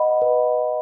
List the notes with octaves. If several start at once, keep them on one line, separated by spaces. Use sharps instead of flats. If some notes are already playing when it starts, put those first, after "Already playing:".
Already playing: B4 D#5 F#5 B5
B4